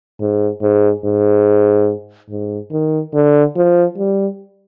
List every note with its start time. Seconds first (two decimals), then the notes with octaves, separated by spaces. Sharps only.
0.20 G#2
0.62 G#2
1.05 G#2
2.30 G#2
2.72 D#3
3.14 D3
3.56 F3
3.98 G3